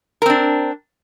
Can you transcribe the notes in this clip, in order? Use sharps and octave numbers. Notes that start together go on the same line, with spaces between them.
C4 D4 A#4